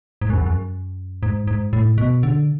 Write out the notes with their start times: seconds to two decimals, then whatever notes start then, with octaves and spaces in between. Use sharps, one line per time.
0.21 G#2
0.30 F#2
0.38 E2
0.46 F#2
1.23 G#2
1.47 G#2
1.73 A2
1.98 B2
2.23 D3